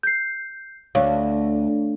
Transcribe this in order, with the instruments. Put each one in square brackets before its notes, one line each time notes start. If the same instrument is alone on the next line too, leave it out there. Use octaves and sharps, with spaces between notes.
[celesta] G6 C7
[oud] D2 [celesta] C#5 F5